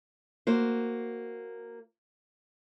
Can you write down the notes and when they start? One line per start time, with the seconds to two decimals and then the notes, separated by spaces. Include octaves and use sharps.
0.47 A#3 F#4 C5